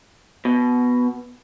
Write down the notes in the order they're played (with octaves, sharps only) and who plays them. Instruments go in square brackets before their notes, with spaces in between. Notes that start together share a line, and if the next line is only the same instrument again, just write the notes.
[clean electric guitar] B2